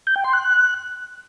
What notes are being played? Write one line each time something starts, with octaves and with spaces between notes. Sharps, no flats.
G6
G5
C6
F#6